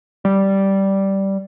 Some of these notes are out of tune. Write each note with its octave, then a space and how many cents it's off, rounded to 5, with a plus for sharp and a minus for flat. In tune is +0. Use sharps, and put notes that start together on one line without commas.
G3 -10